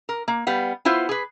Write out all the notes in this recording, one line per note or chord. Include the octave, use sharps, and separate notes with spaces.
A#4
A#3
G3 B3 F5
B3 E4 F4 C5
G#4 B4